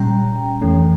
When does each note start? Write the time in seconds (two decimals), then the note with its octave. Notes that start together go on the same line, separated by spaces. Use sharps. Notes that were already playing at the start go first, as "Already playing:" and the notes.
Already playing: A#2 G3 C#4 G5 A#5
0.62 F2 E3 A3 C#4